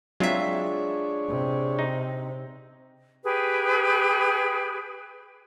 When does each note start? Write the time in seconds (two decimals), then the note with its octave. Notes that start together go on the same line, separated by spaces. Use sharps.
0.20 F#3 G#3 C4 D4 F4 G#4 C#5 E5
1.29 C3
1.79 D#4
3.24 G4 G#4 B4